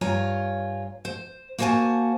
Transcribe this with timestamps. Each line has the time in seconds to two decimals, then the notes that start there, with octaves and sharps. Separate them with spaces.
0.01 G2 F4 C#5 G#5 A#5
1.05 C5
1.58 A#3 F#4 C5 F#5 G#5 A5